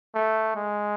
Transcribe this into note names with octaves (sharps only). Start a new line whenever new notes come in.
A3
G#3